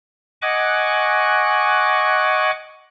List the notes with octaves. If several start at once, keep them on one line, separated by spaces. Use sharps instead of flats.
D#5 F#5 G#5 C#6 D6 F#6